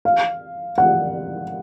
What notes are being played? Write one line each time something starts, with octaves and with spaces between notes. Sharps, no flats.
F5
F#5